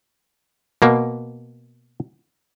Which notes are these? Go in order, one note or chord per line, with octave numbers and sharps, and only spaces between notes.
B2 A#3